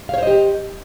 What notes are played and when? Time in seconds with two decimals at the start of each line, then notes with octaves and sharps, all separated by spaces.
0.09 F5
0.14 C#5
0.18 C5
0.23 D#5
0.27 G4